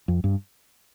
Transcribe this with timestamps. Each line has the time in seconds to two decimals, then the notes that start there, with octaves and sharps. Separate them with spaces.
0.08 F2
0.24 G2